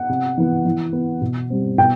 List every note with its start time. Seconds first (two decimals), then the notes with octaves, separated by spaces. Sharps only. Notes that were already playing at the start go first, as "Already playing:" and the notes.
Already playing: F#5
0.09 C3
0.38 E3 B3
0.65 E3
0.93 B3
1.21 B2
1.50 G3 C4
1.78 B2 G5